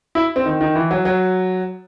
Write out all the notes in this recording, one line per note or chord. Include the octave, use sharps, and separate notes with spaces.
E4
C4
D#3
D#3
E3
F#3
F#3